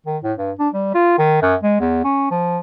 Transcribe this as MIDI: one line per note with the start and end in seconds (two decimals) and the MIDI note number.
0.06 0.18 51
0.24 0.33 45
0.38 0.51 43
0.59 0.69 62
0.74 0.92 55
0.94 1.18 65
1.18 1.40 51
1.42 1.55 42
1.63 1.79 56
1.80 2.04 40
2.04 2.28 61
2.31 2.59 53